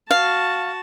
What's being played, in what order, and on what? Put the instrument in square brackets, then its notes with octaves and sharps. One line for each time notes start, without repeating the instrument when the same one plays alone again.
[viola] F#4 A5 [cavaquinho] F5